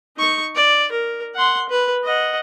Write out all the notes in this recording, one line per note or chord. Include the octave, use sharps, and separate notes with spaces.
D#4 C#6
D5
A#4
F#5 C6
B4
D#5 F#5